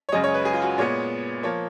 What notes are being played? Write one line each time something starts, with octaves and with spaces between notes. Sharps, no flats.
C#5
F#2 C#3 G#3 D#5
C#5
B4
G#4
F4
F#4
A#2 G#3 B3 C#5
F3 A#3 C#5